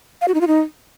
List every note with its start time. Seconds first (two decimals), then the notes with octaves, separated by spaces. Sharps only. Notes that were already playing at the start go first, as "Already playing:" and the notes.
0.21 F5
0.28 F#4
0.34 D#4
0.41 F4
0.47 D#4